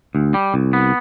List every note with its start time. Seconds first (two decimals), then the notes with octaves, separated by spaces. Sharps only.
0.15 D2
0.34 G3
0.54 C2
0.73 B3